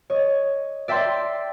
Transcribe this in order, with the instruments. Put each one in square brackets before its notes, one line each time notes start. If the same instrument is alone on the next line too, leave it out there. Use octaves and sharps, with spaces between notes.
[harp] C#5 D#5
D5 E5 G5 A5 C6